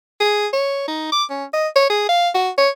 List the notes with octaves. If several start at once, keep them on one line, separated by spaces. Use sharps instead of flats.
G#4
C#5
D#4
D6
C#4
D#5
C#5
G#4
F5
F#4
C#5